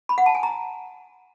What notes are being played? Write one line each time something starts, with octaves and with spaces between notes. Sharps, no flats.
B5
F#5
A5
G#5
A#5